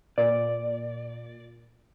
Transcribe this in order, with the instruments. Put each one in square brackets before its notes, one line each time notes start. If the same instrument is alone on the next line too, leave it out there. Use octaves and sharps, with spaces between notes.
[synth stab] A#2 [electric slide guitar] D5